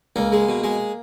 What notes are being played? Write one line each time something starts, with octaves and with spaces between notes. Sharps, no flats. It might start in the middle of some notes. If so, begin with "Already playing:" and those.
C#2 A#3
G#3
B2
G#3